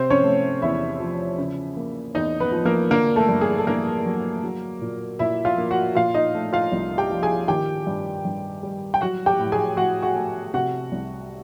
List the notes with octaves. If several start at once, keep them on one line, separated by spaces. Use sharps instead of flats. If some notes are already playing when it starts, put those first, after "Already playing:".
Already playing: C3 C4 C5
C#4 C#5
A3
E2 E4 E5
F3
C#3
A#3
E2 D#4 D#5
B3 B4
F3
A#3 A#4
D3 A#3 A#4
A3 A4
G2
G#4
A4
G2 A#3 A#4
F#3
F#3
A#2
A#2 E4 E5
F4 F5
A#3
F#4 F#5
A#2 F4 F5
D#4 D#5
A3
F4 F5
C2
G4 G5
F3
G#4 G#5
D#3 G4 G5
G2
G2
G3
G5
F#3 F#4 F#5
G4 G5
A2
G#4 G#5
A2 F#4 F#5
F#4 F#5
A3
C3 F#4 F#5
C2